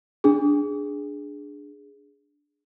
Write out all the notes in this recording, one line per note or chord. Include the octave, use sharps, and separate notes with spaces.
D4 G#4